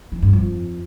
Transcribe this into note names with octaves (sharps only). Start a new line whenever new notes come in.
E3
G2
F2